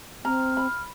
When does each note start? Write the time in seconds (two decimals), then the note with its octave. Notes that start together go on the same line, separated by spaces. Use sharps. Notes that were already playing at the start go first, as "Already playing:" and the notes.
0.25 C4 A#5 F6
0.57 B5